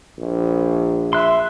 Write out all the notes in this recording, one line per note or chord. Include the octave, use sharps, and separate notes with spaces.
A#1
E5 C6 F#6